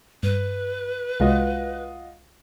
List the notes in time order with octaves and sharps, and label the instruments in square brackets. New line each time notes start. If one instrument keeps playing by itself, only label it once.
[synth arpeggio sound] G2 [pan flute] B4
[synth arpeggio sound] C2 G#3 [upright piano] F4 F#4 D#5